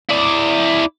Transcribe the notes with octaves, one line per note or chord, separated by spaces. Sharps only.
E4 D5